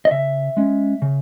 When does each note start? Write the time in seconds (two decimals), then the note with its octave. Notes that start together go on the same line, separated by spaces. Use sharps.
0.05 D#5
0.11 C#3 E5
0.57 G#3 C#4
1.02 C#3